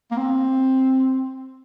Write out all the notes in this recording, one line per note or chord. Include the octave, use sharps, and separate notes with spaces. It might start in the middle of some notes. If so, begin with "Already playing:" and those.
A#3
C4